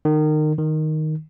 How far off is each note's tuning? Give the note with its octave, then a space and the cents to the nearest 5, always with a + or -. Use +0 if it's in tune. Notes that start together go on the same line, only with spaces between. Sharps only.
D#3 -25
D#3 +0